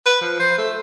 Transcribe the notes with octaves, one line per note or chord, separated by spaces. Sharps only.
B4
F3
C5
A3